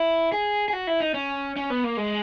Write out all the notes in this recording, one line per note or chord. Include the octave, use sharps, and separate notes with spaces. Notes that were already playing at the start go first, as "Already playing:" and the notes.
Already playing: E4
G#4
G#4
F#4
E4
D#4
C#4
C#4
B3
A#3
G#3